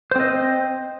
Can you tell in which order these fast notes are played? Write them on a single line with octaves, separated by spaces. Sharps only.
C5 C4 D#5